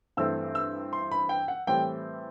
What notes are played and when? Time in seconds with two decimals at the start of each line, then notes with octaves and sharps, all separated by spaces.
0.17 G2 E3 A3 C4 E6
0.55 E6
0.93 C6
1.12 B5
1.29 G5
1.48 F#5
1.67 A2 E3 G3 C4 G5